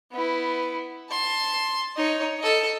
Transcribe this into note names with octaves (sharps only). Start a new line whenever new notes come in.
B3 E4
A5 C6
D#4 C#5
A4 D#5